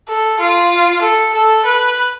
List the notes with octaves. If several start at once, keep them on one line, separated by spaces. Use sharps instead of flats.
A4
F4
A4
A4
B4